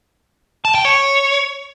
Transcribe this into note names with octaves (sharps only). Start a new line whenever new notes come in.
A5
G5
C#5